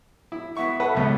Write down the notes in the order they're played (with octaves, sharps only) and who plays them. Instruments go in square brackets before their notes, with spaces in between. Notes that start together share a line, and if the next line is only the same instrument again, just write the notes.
[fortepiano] E4
[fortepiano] B3 C#6 [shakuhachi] E5
[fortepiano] A4 B4 F#5
C#2 B2